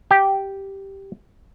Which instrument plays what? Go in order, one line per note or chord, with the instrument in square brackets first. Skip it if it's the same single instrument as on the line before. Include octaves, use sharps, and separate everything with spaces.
[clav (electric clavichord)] G4 G5